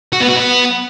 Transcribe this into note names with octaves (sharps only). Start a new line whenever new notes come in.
F#4
B3
F#4
B3